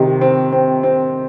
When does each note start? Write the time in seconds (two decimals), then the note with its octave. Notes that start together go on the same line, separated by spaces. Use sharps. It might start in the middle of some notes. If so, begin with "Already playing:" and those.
Already playing: C3 D#3
0.21 C4
0.52 C4
0.83 C4